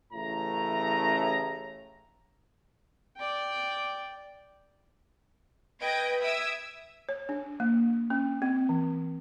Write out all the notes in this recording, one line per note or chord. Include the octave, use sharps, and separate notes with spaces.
A1 A2 C#3 E4 A#5
D5 G5
B4 D#5 G5 G#6 A#6 D7
E5 D#6 E6 G#6 D7
C#5
D4
A#3
C#4
C4
E3